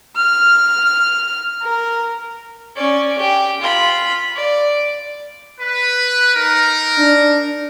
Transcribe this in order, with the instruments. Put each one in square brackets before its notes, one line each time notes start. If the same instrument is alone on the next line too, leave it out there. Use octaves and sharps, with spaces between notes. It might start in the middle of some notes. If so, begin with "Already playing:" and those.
[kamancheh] F6
A#4
[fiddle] C#4 D5
G4
F4 B5
D5
[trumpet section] B4
D#4 A#4
[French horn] D4